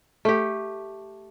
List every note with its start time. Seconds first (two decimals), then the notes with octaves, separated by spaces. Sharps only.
0.25 A3 G4